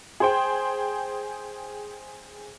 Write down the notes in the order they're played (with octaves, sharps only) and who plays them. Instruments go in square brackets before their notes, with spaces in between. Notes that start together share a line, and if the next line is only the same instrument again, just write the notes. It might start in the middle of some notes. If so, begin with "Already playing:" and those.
[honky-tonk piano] G#4 C5 G5